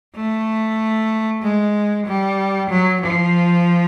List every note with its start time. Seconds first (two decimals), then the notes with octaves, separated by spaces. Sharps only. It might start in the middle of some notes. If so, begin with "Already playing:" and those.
0.16 A3
1.42 G#3
2.06 G3
2.70 F#3
3.01 F3